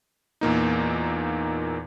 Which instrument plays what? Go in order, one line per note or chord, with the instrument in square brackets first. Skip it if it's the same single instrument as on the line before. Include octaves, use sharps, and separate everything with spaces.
[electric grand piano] E2 A#2 A#3 D#4